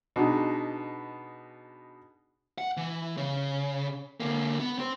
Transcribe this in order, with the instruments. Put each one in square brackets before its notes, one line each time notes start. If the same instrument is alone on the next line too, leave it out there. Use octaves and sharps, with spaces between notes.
[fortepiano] B2 D4 D#4 G#4
[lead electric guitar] F#5
E3
C#3
D3 A#3
B3
C4 C5